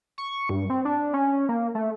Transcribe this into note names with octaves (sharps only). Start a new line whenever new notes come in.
C#6
G2
C4
D4
C#4
A#3
A3